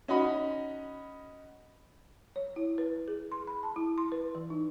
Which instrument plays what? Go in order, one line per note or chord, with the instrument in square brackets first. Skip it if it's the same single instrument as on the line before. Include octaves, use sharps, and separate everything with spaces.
[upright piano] C#4 D#4 F#4 D#5 B5
[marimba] C#5
E4
B4
G#4
C6
B5
A5
E4
C6
B4
E3
D#4